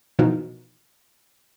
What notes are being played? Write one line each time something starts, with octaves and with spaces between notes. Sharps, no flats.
B2 E3 F3 D#4 F#4 A#4